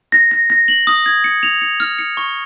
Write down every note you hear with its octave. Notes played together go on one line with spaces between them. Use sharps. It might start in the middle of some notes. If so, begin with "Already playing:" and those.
A#6
A#6
A#6
F#7
D#6
G#6
C#7
F7
C#7
F6
C#7
C#6